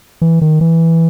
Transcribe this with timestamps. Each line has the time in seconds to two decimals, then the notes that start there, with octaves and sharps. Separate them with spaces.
0.21 E3
0.41 D#3
0.61 E3